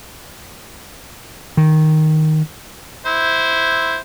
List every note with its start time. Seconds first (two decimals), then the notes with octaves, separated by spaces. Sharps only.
1.57 D#3
3.06 E4 C5